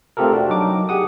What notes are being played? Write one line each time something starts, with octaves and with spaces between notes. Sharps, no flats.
A3 C4 F4 G4 A4 A#4
D4 F#4
F#3 D#4 D6
G4 G#4 F#5 D#6